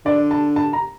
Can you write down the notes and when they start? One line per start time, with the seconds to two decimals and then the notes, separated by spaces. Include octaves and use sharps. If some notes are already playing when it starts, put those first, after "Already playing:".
0.05 D3 D5
0.31 A5
0.56 A5
0.73 A#5